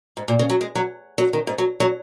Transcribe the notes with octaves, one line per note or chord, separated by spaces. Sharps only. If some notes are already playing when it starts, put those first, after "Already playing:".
G#2
A#2
C#3
F#3
G#3
F#3
F#3
D#3
G#2
F#3
F#3